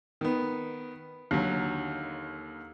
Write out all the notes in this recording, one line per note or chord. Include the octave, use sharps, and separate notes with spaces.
D#3 B3
D#2 D3 F#3